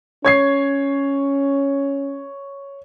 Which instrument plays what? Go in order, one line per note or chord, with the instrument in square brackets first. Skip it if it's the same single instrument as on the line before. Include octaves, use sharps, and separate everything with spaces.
[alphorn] C#4 [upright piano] C#5 G#6 C7